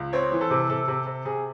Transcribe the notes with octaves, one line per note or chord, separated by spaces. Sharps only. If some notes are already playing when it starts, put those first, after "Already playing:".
Already playing: C#2
C4 C#5
E3
A4
C3
C3 A4
C3
C3
C3 G#4